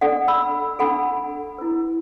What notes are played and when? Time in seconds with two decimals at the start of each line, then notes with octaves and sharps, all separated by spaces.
0.01 D4 A4 D5 F#5
0.28 B5 E6
0.79 D4 A4 F#5 B5
1.58 E4 B4